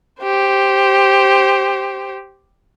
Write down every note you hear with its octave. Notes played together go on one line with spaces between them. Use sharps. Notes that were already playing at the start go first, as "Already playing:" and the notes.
G4 C5